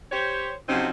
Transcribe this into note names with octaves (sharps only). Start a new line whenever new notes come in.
G4 C5 C#5
C3 F3 F#3 C4 C#4 D#4